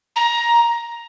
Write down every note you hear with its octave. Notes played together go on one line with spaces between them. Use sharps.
A#5